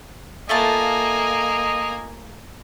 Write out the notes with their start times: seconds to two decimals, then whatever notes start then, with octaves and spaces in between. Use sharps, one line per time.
0.49 A3 A#3 F4 D#5 G#5 A5